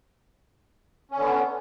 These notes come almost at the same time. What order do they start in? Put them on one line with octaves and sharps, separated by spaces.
C#4 D3 B3